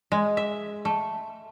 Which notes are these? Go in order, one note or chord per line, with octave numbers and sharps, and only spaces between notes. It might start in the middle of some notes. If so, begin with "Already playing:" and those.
G#3
E5
A3